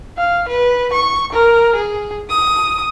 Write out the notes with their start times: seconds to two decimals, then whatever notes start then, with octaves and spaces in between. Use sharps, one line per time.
0.17 F5
0.49 B4
0.93 C#6
1.33 A#4
1.76 G#4
2.30 D#6